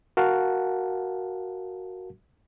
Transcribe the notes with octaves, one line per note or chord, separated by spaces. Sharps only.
F#4 A#4 F5 F#5 A5